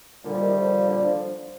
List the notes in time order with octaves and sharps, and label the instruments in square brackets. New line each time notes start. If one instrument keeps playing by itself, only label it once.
[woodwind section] A#2 D3 [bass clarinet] G3
[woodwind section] F3
C3 D#3
D3 F3
C3
A#2 D3
D3 F3